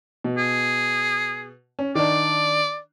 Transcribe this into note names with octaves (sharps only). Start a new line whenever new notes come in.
B2
G#4
C#4
D#3 D4 D5